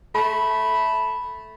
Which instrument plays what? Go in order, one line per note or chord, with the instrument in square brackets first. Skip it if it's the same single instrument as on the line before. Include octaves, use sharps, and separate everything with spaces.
[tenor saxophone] A3 [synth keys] B5